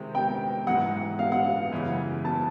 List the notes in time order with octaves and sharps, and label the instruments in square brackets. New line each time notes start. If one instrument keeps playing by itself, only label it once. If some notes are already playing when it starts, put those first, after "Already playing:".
Already playing: [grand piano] C3 D#3 G#3 C4 E4
[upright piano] G5
[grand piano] G#2 E3 G#3 [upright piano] F#5
[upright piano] F5
F#5
F5
[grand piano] F#2 C#3 E3 G#3 B3
[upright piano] A5